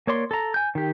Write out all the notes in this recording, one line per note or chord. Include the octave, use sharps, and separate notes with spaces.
A#3 C#5 D5 C6
A4 A#5
G#5 G6
D#3 G4